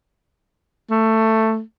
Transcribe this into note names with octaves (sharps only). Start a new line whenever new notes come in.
A3